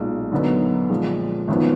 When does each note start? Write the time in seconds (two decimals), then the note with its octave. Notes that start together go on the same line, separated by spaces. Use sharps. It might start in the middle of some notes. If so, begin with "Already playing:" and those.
Already playing: B1 A#2 G#3
0.32 F#2 D3 F#3 B3 D#4
0.90 A#2 F3 G#3
1.48 G#1 F#2 F3 B3